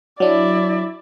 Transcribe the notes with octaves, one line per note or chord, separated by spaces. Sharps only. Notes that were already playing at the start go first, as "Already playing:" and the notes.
F#3 D4 E4 D5